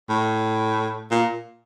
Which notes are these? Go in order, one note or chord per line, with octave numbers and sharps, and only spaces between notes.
A2
A#2